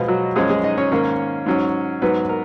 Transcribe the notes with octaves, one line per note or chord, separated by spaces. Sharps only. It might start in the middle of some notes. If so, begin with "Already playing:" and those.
Already playing: B2 F3 G#3 B3 F4
F#3 F#4
F#2 F3 G#3 C#4 G#4
G#3 G#4
D#4 D#5
C#4 C#5
G#2 D#3 A#3 C#4
G#2 F#3 C#4
G#2 F#3 B3 B4
A#4